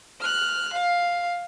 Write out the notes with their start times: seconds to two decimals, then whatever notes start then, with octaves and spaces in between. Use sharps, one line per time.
0.20 F6 F#6
0.73 F5